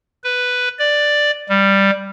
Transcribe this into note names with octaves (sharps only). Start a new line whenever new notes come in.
B4
D5
G3